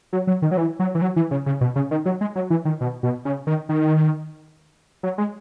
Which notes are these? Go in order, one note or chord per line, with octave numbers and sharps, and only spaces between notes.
F#3
F#3
D#3
F#3
E3
F#3
E3
F#3
E3
C#3
C#3
B2
C#3
D#3
F#3
G#3
F#3
E3
D#3
B2
B2
C#3
D#3
D#3
F#3
G#3